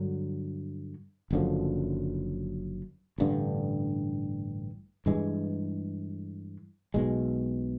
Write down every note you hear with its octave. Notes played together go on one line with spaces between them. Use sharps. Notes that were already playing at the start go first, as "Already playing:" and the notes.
Already playing: G2 D3 F#3
F#1 F#2 D3 F3
A1 G2 D3
G2 E3 G#3
B1 B2 G#3